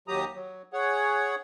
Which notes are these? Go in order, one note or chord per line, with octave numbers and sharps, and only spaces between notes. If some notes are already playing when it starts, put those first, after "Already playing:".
D#2 F#3 G4 A#5 D#6
F#3
G#4 C#5 F#5